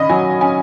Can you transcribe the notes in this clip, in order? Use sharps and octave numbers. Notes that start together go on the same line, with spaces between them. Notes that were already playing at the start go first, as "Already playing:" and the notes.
Already playing: D#3 C#4 D#5 B5
F#3 G#5
C#4 G#5